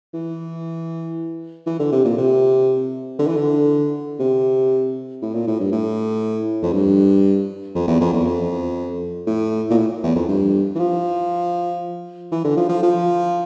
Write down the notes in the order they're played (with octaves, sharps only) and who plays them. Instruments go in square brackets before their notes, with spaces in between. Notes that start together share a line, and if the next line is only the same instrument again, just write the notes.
[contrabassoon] E3
E3
D3
C3
A#2
C3
D3
E3
D3
C3
A2
A#2
A2
G2
A2
F2
G2
F2
E2
F2
E2
F2
A2
A#2
A2
E2
F2
G2
E3
F3
E3
D3
F3
F3
F3